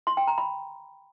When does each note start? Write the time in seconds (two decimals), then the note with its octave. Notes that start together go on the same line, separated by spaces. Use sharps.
0.07 C6
0.17 G5
0.27 A#5
0.38 B5